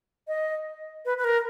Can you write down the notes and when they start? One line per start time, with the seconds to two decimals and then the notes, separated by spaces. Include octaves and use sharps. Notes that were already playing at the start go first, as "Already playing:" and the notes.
0.28 D#5
1.05 B4
1.18 B4
1.24 A#4